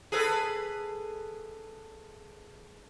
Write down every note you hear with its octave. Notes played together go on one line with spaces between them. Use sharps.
G#4 A4 B4